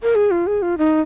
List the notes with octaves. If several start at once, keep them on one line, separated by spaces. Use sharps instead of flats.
A#4
G#4
F4
G#4
F4
D#4